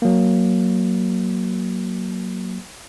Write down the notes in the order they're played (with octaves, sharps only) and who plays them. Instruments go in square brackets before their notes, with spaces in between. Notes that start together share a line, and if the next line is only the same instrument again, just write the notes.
[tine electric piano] F#3 A#3